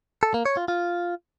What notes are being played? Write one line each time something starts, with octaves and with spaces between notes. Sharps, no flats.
A4
A#3
C#5
F4
F4